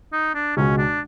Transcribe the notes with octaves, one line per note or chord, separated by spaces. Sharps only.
D#4
D4
C#2 B2 G#3 C#4
D4